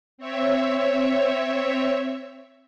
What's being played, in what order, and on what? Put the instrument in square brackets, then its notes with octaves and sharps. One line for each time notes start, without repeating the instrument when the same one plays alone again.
[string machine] C4 C#5 E5